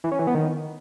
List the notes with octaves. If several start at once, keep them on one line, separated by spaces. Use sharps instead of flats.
E3
C#4
E3
B3
D#3